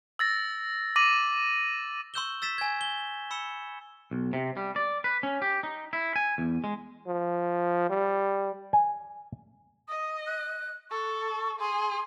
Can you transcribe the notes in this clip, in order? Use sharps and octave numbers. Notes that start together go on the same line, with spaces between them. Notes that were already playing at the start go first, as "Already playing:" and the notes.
E6 A6 A#6
D6 A#6 D#7 F#7
C6 C#6 E6 G6 E7 G7
E6 A6 B6 E7
G#5 G#6
G7
B5 E6 C#7 E7 G7
B1
C3
G3
D5
B4
C#4
G4
D#4
E4
G#5
E2
G#3
F3
G3
G#5
D#5 D#6
F#6
A4 C#6
G#4 C6